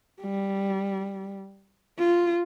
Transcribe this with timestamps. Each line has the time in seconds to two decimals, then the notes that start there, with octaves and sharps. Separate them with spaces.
0.22 G3
1.99 F4